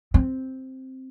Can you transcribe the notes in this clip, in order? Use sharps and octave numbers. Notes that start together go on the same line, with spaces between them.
C4